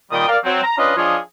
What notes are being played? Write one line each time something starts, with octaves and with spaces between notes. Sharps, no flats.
A#2 D#3 G3 G5 D#6
A#4 D5 F5
F#3 C4
A#5
C#4 D4 F4 B4 D#5
F3 D4 F4 G#4 C#5 D#5